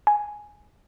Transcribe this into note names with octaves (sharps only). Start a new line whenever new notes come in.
G#5